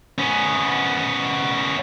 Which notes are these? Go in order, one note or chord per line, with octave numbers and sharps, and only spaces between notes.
B3 C#4